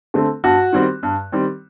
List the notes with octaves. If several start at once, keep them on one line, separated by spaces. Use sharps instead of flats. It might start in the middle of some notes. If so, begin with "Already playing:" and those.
D3 A3 C4
G2 F#4
D#3 G3 C4
G2
D#3 G3 C4